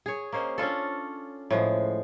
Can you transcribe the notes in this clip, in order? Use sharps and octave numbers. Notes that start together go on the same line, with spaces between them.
G#4 C#5
A#3 C#4 C5 D#5
C#4 D4 F4 A4
A2 F3 G#3